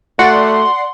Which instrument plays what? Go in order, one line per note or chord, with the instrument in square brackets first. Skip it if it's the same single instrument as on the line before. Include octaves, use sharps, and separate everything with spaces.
[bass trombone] A3 [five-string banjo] F#4 [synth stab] D5 F#5 [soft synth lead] C6